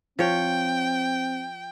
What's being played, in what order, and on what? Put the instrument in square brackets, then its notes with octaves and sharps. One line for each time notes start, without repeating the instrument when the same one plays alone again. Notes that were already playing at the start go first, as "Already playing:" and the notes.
[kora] F3 C#5 [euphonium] C4 [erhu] G5